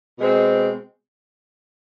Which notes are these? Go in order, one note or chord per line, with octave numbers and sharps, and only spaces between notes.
B2 G#3 C4